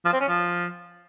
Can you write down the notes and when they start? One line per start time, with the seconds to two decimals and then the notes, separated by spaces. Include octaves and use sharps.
0.05 F3
0.13 C4
0.21 C#4
0.28 F3